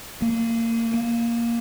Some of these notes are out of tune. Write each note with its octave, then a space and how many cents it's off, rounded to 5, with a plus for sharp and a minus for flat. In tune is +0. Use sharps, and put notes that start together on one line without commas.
A#3 -25
A#3 +5